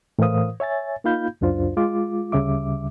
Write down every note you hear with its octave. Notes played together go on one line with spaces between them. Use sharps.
A2 E3 A#4 C5 F5 D#6
C#5 E5 G#5 A6
A#3 D#4 F4 F5 B5 G6
C#2 F#2 D4 F4 C5
G#3 F4 D6
D2 C#3 G3 E5 D6